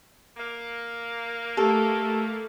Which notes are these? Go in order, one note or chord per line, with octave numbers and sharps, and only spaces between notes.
A#3
A3 G4 A4